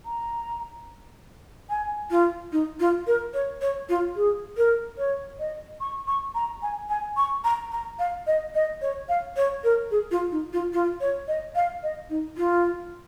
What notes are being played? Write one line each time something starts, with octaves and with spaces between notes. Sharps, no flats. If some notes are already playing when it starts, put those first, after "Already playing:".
A#5
G#5
F4
D#4
F4
A#4
C#5
C#5
F4
G#4
A#4
C#5
D#5
C#6
C#6
A#5
G#5
G#5
C#6
A#5
A#5
F5
D#5
D#5
C#5
F5
C#5
A#4
G#4
F4
D#4
F4
F4
C#5
D#5
F5
D#5
D#4
F4